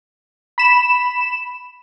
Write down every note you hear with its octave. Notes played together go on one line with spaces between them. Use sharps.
B5 E7